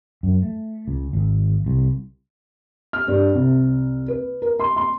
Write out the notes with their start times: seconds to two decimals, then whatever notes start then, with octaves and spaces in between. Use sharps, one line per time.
0.23 F#2
0.43 A3
0.88 C#2
1.13 G#1
1.66 C2
2.93 F6
3.08 G2
3.34 C2
4.08 B4
4.42 A#4
4.60 C6
4.76 C6